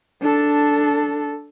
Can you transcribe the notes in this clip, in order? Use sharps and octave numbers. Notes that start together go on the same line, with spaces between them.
D4 A4